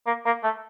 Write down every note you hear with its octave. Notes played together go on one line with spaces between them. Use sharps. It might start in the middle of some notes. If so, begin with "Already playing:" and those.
A#3
A#3
A3